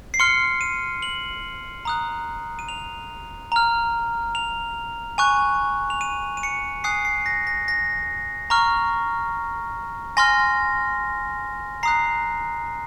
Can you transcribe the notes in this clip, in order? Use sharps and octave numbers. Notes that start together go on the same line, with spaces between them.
C7
C6 F6 C#7
D#7
F#7
A#5 D#6 F#6
D#7
F7
A#5 F6
F7
G#5 C#6 F#6
F7
D#7
D#7
C#7
G#5 D#6 F#6 C7
C7
A#6
A#6
A#6
A#5 C#6 F6
G#5 C6 F6 A#6
A#5 D#6 F#6 C7